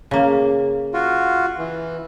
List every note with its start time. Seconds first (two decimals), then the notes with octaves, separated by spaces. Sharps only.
0.11 C#3 A#3
0.94 F4 F#4
1.58 E3